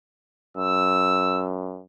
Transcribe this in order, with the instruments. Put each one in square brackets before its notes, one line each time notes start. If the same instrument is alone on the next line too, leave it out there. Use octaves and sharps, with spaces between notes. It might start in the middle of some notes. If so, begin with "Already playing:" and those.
[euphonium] F#2 [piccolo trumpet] E6